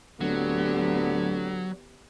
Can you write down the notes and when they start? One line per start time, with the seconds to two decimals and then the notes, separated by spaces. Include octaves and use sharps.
0.21 D1 D3 F#3 B3 G4